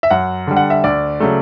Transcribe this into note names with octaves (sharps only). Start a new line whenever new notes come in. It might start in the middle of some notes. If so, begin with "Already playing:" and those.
E5
F#2 F#5
D3 G3
F#5
E5
D2 D5
C#3 F#3 A3